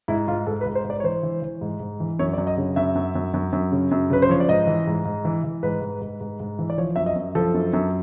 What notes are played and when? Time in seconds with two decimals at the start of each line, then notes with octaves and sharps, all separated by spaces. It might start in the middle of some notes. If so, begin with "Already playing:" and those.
0.08 G#2 E4
0.28 G#2 F4
0.47 G#2 A4
0.61 B4
0.66 G#2
0.75 C5
0.85 G#2
0.90 D5
1.00 C#5
1.03 E3 C5
1.23 E3
1.42 E3
1.61 G#2
1.80 G#2
2.00 E3
2.19 F#2 C#5
2.33 D5
2.38 F#2
2.47 D#5
2.57 C#3
2.76 F#2 E5
2.95 F#2
3.15 F#2
3.34 F#2
3.53 F#2
3.72 C#3
3.91 F#2
4.10 C#3 B4
4.22 C5
4.29 F3 C#5
4.40 D5
4.48 G#2 D#5
4.67 E3
4.87 G#2
5.05 G#2
5.25 E3
5.44 E3
5.63 G#2 B4
5.82 G#2
6.02 G#2
6.21 G#2
6.40 G#2
6.59 E3
6.70 D5
6.78 F3 C#5
6.96 F#2 E5
7.06 D#5
7.16 F#2
7.35 F3 A4
7.54 F#2
7.73 F#2